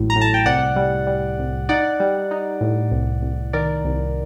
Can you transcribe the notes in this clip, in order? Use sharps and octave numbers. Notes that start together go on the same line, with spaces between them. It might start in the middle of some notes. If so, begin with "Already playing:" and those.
Already playing: A1 A2 F#3
A#5
A2
A5
G5
C2 D5 F#5
G3
G3
C2
D#4 D5 F#5
G3
D#4
A2
C2
C2
D#3 A#4 D5
C2